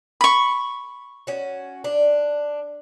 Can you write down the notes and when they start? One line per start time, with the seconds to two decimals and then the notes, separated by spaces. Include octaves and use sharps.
0.21 B5 C#6
1.27 C#4 F#4
1.84 D4